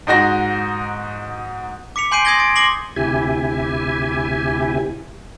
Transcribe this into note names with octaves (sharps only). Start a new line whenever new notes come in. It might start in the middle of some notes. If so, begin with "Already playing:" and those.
G#2 D#4 F#4 A#6
D6 B6 C#7 F7
G#5 C6 G6 C7 D7 D#7
C6 D#6 G6 G#6 A#6 G7
A6 D7
C6 D6 A#6 C7 F#7 G7
D2 C3 E4 G4 G#5